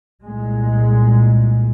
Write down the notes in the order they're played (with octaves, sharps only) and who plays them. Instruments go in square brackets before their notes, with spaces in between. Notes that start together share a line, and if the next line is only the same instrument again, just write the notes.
[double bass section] C2 A#2 G#3